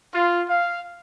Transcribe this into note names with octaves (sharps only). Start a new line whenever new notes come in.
F4
F5